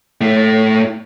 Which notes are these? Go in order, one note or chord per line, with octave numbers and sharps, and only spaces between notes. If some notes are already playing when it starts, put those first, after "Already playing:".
A2 A3